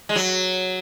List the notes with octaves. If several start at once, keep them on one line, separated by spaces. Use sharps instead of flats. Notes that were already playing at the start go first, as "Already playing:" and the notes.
G#3
F#3